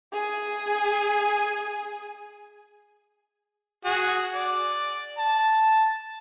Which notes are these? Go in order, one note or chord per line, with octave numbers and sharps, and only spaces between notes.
G#4 G#5
F#4 G#4
D5
A5